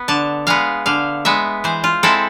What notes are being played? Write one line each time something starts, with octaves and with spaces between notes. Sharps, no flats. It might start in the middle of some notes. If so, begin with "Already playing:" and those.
Already playing: B3
D3 A5
G#3 B3 F5
D3 F5
G#3 B3 E5
E3 C5
F4
G#3 C4 E4 A4